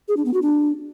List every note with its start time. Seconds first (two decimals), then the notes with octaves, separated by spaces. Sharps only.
0.08 G#4
0.17 D4
0.25 B3
0.34 F#4
0.42 D4